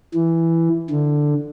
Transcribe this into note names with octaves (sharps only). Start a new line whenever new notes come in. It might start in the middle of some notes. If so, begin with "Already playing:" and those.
E3
D3